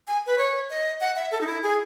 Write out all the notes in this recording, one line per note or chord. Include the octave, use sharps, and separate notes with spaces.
G#5
B4
C#5
D#5
F#5
E5
A4
D#4
E4
G#4